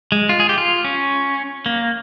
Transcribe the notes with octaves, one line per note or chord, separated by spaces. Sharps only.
G#3
F4
G#4
G4
F4
C#4
A#3